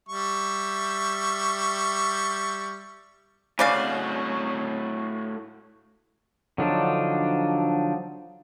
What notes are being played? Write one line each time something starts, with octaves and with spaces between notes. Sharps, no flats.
G3 E5 C#6
A2 C#3 F#4 D5 F5
D3 F3 F#3 D4 D#4